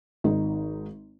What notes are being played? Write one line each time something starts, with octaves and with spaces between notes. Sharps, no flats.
G#1 D#4